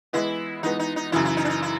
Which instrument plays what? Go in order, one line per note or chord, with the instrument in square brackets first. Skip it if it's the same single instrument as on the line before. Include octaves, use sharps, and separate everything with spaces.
[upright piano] E3 G#3 B3 [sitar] E4
[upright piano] E3 G#3 B3 [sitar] D#4
[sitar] D#4
D#4
[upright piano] F#2 C#3 E3 [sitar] E4
[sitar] E4
D#4
D4
D#4
E4